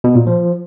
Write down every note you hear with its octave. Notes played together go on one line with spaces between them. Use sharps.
B2
A#2
F3